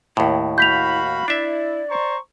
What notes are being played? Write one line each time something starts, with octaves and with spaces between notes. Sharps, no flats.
D#2 A2 E4
F#4 F5 B5 G6 B6 F7
D4 E4 D5 E5
C5 A#5 C#6